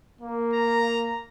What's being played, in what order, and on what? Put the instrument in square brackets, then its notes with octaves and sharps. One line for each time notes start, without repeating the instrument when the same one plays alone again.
[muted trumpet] A#3
[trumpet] A#5